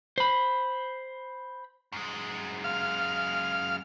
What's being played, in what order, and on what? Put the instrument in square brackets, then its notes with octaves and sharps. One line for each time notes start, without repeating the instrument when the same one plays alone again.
[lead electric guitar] C5 B5
F#2 G#3
[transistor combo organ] F5